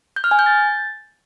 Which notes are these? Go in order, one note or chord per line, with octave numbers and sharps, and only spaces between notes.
G6
F6
G#5
G6
A6